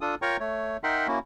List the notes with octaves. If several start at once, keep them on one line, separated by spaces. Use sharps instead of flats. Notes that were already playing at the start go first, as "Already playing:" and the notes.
D4 F4 A4 D#6
F4 A#4 C#5 G5 A#5 C#6
A3 C#5
D#4 A#4 E5 F#5 G5 C6
A#3 C#4 E4 F#4